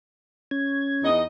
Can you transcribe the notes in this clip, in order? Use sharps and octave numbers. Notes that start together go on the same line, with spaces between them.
C#4 G#6
E2 D#4 D#5